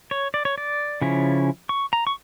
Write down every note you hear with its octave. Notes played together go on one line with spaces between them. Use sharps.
C#5
D5
C#5
D5
C#3 F3 C#4 E4
C#6
A#5
C#6